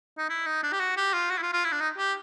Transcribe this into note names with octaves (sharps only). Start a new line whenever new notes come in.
D#4
E4
D#4
D4
G4
F#4
G4
F4
F#4
E4
F4
F4
E4
D4
D#4
G4